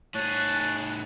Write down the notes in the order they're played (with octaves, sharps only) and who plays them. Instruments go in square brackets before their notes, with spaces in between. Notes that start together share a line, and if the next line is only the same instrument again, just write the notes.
[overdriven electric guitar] A2 G#4 [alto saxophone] C#5 [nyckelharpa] A5 [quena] F#6